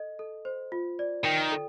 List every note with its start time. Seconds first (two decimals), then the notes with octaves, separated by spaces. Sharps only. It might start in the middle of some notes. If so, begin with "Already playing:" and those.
Already playing: A4 D#5
0.19 A4
0.45 C5
0.72 F4
0.99 D5
1.25 D#3 G5
1.52 A4